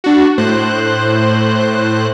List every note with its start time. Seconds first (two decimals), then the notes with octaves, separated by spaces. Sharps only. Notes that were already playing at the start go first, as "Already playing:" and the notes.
0.04 D4 F#4
0.38 A2 C5 F#6